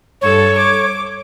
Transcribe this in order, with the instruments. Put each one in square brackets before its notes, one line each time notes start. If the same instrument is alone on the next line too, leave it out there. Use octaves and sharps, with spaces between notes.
[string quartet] G2 A4 [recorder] C#5
[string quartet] D6